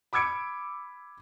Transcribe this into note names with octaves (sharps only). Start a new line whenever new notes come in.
B5 D6 E6 G#6 C#7 D7